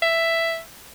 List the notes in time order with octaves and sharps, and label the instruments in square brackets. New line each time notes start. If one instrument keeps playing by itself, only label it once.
[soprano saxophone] E5